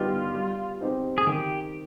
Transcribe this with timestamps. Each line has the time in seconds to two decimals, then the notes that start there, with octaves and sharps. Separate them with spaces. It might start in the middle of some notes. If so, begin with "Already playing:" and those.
Already playing: D3 G3 B3 D#4 F4 G4
0.34 G3
0.81 C4 D#4 G4 C5
1.18 G#4
1.27 D#3 G4